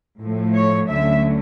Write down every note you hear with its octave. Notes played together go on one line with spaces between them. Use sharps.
A2 F3 A3
C#5
D2 D3 F#3 A3 C#4 E5